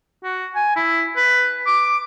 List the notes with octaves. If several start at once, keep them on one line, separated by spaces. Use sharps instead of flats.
F#4
G#5
E4
B4
D6